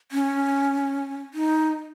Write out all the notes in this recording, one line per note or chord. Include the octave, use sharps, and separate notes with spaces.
C#4
D#4